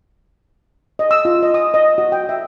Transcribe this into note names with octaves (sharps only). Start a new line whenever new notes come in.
D#5
E6
F4
D#5
D#6
D#5
F#4
G5
E5